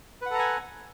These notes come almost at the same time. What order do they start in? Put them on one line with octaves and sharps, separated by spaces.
B4 F#5 A4 A#5 G#5